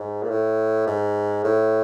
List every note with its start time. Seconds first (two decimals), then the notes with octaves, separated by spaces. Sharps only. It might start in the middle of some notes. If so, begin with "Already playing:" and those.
Already playing: G#2
0.23 A#2
0.30 A2
0.87 G#2
1.44 A2